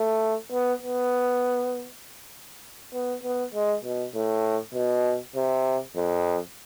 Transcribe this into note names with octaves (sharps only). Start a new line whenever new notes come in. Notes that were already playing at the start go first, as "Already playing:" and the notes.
Already playing: A3
B3
B3
B3
B3
G#3
B2
A2
B2
C3
F2